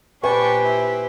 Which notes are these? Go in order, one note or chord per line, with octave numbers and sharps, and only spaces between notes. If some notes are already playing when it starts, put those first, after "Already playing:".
A#2 D4 G4 B4 C5 G5 G#5 C#6
E4